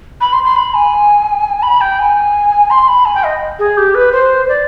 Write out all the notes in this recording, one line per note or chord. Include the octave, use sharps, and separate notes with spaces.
B5
C6
C6
B5
G#5
B5
G5
G#5
C6
B5
G#5
G5
D#5
G#4
G4
B4
C5
D5